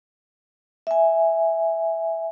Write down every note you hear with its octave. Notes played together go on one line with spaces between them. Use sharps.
E5 G#5